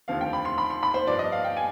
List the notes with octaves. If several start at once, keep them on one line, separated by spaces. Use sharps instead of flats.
F1 D#2 D3 F3 C4 F5
G5
B5
C6
B5
C6
B5
C5
G2 F3 B3 D4 D5
D#5
F5
G5
G#5